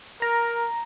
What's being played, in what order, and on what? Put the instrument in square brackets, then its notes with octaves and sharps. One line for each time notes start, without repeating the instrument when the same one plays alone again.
[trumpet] A#4 [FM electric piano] A#5